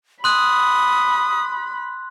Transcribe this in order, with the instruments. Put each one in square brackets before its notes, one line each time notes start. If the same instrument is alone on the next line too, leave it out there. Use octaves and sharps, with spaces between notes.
[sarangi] B5 [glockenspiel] C6 F#6 [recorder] D#6